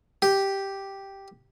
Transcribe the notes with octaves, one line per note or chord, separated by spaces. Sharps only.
G4